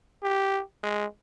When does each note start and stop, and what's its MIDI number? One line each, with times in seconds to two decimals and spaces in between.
0.23 0.61 67
0.83 1.06 56